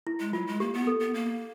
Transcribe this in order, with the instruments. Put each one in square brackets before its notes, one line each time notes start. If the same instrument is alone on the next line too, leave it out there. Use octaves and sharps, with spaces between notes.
[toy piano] E4
[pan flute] G#3
[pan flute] F#3 [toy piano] F4
[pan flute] G#3
[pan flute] A#3 [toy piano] G4
[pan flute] B3
[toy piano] A4
[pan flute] B3
A#3